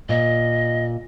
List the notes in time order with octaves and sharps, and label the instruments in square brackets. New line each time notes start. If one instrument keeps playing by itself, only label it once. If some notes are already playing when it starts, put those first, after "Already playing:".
[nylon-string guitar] A#2 [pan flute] D#5